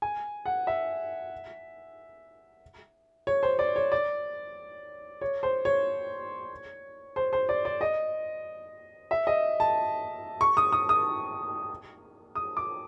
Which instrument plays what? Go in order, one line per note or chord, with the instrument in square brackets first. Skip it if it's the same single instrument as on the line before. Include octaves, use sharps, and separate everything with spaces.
[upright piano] G#5
F#5
E5
C#5
C5
D5
C#5
D5
C#5
C5
C#5
C5
C5
D5
D5
D#5
E5
D#5
A5
C#6
D#6
D#6
D#6
D#6
D6